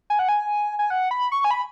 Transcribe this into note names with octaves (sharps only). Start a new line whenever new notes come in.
G#5
F#5
G#5
G#5
F#5
B5
C#6
G#5
B5